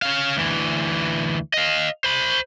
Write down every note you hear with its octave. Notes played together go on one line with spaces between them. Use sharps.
C#4 F5
D2 E3
D#5 F5
C5 B5